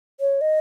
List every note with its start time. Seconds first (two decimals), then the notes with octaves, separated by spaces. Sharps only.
0.20 C#5
0.41 D#5